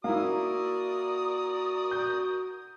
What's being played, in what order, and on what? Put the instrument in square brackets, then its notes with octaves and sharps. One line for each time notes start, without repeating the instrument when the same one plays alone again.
[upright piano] A#3 E4 [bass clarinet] F#4 [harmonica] A#4 D5 D#6
[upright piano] G6